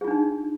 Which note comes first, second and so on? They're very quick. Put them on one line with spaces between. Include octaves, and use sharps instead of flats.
G#4 F4 D4 D#4